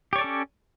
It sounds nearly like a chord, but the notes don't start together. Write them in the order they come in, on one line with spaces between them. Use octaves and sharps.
G4 C#5 D5 A4 C#4